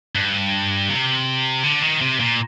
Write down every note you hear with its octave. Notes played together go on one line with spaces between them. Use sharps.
G2
C3
D3
D#3
C3
A#2